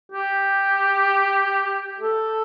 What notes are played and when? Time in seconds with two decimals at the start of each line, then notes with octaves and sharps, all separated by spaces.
0.12 G4
2.00 A4